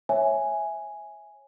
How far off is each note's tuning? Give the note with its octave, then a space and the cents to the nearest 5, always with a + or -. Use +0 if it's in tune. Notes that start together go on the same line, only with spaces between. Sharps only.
C#5 -15 E5 +0 G#5 +0